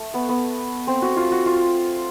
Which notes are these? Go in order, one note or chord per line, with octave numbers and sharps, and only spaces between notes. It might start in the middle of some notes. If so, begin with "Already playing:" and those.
Already playing: A3
B3
B3
C4
F#4
F4
F#4
F4